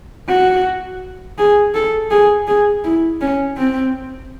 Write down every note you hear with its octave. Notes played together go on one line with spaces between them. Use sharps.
F#4
G#4
A4
G#4
G#4
E4
C#4
C4